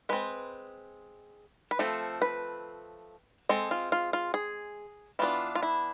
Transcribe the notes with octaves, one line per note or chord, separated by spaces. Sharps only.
G#3 C4 B4
B4
F3 A3 C4 A4
B4
G#3 C4 A4
F4
F4
F4
G#4
E3 B3 D4 F4
F4
E4